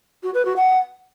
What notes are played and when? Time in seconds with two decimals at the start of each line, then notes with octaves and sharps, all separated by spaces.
0.23 F#4
0.34 B4
0.45 F#4
0.56 F#5